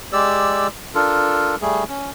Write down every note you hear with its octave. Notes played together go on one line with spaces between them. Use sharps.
G#3 G4 D5 E6
D4 F4 A4 A#4
G3 A3 G#4
C#4